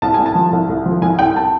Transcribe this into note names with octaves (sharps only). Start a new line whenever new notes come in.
C2 A5
C2 G#5
A5
F3
C2
C2
F3
C2 G#5
C2 G5
A5